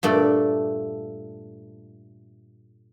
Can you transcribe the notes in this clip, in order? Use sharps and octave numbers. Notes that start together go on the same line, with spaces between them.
G2 A#2 A3 D5